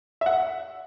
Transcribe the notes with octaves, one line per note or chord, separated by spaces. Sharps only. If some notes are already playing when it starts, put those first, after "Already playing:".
E5
F#5